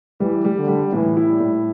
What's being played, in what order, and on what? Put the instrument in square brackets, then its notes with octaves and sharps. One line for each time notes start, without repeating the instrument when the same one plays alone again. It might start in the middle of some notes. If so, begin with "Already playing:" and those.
[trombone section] E3 [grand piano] G3
[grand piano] G3
[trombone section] D3
[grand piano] G3
[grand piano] A2 [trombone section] E3
[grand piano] E4
[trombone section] G3
[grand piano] A2